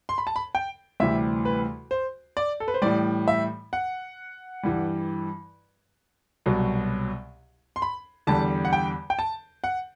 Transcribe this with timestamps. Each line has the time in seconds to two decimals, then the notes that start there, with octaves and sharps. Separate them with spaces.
0.09 C6
0.18 B5
0.27 A5
0.36 B5
0.55 G5
1.00 D2 C3 E3 G3 E5
1.45 B4
1.91 C5
2.37 D5
2.60 A4
2.68 B4
2.74 C5
2.82 A2 E3 G3 D5
3.28 E5
3.73 F#5
4.63 G2 E3 G3
6.46 C2 B2 F#3
7.76 C6
7.82 B5
8.27 E2 D3 G3 A5
8.65 F#5
8.73 G5
9.10 G5
9.19 A5
9.64 F#5